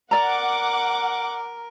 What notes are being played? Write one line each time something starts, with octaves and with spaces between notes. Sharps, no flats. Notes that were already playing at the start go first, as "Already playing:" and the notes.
A#4 D5 F#5 A#5 D6